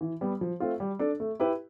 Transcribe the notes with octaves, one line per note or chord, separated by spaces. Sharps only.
E3
G3 B3
F3
A3 C4 F4
G3
D4 A4
A3
E4 G4 B4